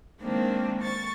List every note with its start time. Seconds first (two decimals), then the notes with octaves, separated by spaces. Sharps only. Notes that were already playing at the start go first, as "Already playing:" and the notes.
0.20 D#3 G#3 A#3 C4 D4
0.79 C#6 A6